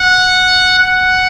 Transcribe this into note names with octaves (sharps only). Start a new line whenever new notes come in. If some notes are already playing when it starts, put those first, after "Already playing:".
Already playing: F#5
F#5